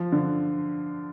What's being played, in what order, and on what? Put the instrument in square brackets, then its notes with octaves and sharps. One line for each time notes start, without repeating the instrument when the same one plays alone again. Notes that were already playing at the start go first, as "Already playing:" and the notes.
Already playing: [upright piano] F3
D3